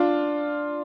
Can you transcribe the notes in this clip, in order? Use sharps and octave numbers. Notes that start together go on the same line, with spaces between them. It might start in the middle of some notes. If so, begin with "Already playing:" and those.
Already playing: D4 F4